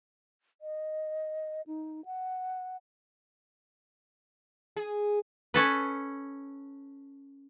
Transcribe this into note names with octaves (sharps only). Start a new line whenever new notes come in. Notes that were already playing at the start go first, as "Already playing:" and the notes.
D#5
D#4
F#5
G#4
C#4 A4 B4